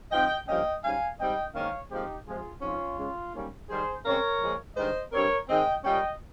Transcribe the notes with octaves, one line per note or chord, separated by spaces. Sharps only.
G#2 F3 C4 D#5 G5
G2 F3 A#3 C#4 D#5 G5
G#2 G3 C#4 F5 G#5
G#2 G3 C4 D#5 G5
G#2 D#3 A#3 C#4 C#5 F5
A#2 F3 G#3 C4 D#4 G4
C3 F3 G#3 C4 F4 G#4
G#2 F3 C4 C#4 F4
C#3 G#3 C#4
G#2 G3 A#3 C#4
G#2 D#3 G3 G#4 C5
C#3 G#3 C4 A#4 C#5
A#2 F3 G#3
G2 D#3 G#3 C5 D#5
G2 G3 C4 A#4 C#5
D#3 G#3 C4 D#5 G5
A#2 G3 A#3 C#4 D#5 G5